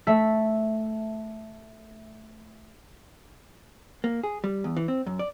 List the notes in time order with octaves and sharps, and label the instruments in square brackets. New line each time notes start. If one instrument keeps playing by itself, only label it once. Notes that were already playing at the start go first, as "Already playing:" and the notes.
[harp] A3 E5
[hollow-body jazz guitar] A#3
G#4
G3
E2
E3
C4
F#2
D5